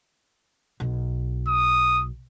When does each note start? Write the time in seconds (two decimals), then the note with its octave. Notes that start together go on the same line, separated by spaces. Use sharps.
0.80 B1
1.48 D#6